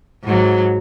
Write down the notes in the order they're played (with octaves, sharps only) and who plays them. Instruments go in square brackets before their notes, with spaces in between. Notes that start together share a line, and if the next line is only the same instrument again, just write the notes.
[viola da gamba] G#2 F#3